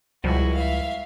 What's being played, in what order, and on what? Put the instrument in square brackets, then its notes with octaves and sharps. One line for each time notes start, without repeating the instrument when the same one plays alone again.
[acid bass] C#2 [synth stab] B2 F3 G3 [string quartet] E4 F#4 G#4
[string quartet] E5 F5